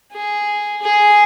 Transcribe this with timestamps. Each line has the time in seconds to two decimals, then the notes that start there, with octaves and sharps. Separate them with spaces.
0.12 G#4
0.82 G#4